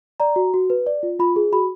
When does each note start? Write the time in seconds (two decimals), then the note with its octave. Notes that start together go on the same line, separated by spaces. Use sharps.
0.20 D5 A#5
0.36 F#4
0.54 F#4
0.70 B4
0.86 D5
1.03 F4
1.19 F4 B5
1.36 G#4
1.52 F#4 B5